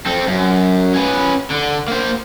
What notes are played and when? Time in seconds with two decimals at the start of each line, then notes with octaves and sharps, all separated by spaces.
0.06 C4 A4
0.27 F#2
0.94 C#4 B4
1.51 D3
1.88 A#3 C5